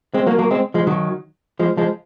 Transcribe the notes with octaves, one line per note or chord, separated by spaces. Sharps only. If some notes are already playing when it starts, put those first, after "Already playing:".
G#3 C4
F#3 A#3
F#3 A#3
G#3 C4
F3 G#3
D#3 F#3
F3 G#3
F3 G#3